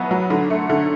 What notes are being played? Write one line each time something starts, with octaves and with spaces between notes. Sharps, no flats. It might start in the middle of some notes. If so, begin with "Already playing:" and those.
Already playing: B2 F#3 B3 E4
F#3
D3
A3
D3